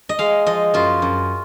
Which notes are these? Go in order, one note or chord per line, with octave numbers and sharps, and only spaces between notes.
D#5
G#3 F5
F3 D#5
F#2 F4
F#2